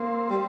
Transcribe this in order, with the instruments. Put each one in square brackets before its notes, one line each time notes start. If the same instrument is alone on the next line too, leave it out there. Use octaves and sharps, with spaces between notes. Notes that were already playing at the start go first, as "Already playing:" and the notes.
Already playing: [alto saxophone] A#3 [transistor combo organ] C4
[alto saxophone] G3